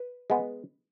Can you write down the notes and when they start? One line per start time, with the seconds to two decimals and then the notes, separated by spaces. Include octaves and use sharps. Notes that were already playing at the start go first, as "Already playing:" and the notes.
Already playing: B4
0.30 G#3 B3